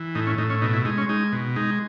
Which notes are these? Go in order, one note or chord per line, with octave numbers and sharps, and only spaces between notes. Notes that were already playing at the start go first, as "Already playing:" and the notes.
Already playing: E3
A2 D#4
C#4
A2 D#4
C#4
B2 D#4
E4
G#3 D#4
C#4
G#3 D#4
B2
G#3 D#4